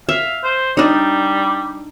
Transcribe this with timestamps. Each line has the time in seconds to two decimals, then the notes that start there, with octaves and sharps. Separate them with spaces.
0.09 E5 F5
0.43 C5
0.77 G3 D4 D#4